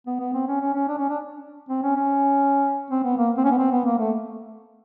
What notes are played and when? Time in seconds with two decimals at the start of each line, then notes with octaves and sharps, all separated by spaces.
0.07 B3
0.20 B3
0.34 C4
0.47 C#4
0.61 C#4
0.74 C#4
0.88 D4
0.98 C#4
1.09 D4
1.69 C4
1.83 C#4
1.96 C#4
2.91 C4
3.04 B3
3.18 A#3
3.38 C4
3.45 C#4
3.51 B3
3.59 C4
3.72 B3
3.85 A#3
3.99 A3